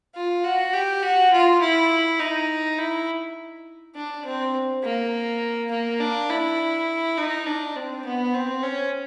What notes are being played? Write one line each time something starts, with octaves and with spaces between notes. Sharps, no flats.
F4
F#4
G4
F#4
F4
E4
D#4
E4
D4
C4
A#3
A#3
D4
E4
D#4
D4
C4
B3
C4
C#4